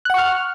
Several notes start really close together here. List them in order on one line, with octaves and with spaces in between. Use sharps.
F#6 F#5 C#6 F6